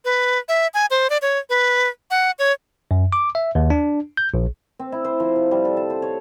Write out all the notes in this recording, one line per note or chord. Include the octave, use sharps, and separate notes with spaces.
B4
E5
G#5
C5
D5
C#5
B4
F#5
C#5
F#2
D6
E5
D#2
D4
G6
A#1
C4
E4
C5
F3
C3
G3
A4
A5
C5
C#5